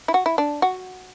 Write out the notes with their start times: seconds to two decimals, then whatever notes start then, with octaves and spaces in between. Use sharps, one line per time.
0.08 E4
0.14 F#4
0.26 E4
0.38 D4
0.62 F#4